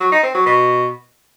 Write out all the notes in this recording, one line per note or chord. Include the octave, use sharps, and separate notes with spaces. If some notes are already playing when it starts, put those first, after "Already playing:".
F#3
D#4
C4
F#3
B2